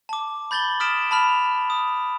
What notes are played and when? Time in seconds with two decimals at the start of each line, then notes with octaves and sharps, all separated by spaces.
0.09 A5 D6
0.51 B5 G6 A6 F#7 G7
0.80 D#6 F6 A6 B6 D7 E7
1.11 A5 B5 F6 F7
1.70 D#6